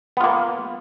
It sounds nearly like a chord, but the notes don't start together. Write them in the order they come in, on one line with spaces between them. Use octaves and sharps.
B3 F4 A#3